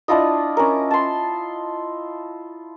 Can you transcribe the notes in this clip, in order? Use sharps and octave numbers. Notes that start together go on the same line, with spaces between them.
D4 E4 F4 D#5
C#4 A#4
A5 C6